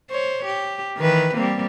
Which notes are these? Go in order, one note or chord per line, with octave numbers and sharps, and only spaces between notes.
C5 C#5
G4
D#3 E3 B4
G3 A#3 C4